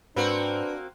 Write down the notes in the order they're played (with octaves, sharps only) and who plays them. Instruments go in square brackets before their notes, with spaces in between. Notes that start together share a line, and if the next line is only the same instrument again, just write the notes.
[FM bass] G#2 [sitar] A#3 C4 F#4 [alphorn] D4 [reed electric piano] B4